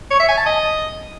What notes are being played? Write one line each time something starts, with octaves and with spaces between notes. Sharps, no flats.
C#5
E5
G#5
A5
D#5